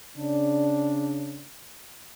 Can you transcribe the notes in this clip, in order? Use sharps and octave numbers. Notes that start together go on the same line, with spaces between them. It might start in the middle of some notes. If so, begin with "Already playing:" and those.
C#3 D4